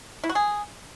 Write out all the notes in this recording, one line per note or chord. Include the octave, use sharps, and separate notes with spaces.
E4
F#4
G#4